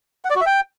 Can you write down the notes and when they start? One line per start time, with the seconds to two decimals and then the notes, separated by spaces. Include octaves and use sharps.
0.25 F#5
0.30 D5
0.36 F#4
0.41 E5
0.46 G5